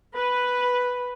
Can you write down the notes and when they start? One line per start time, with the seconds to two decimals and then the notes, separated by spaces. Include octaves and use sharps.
0.16 B4